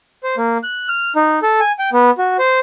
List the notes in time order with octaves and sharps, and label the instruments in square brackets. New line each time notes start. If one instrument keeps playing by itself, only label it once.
[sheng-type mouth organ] C5
A#3
F#6
F6
D#4
A4
G#5
G5
B3
F#4
C5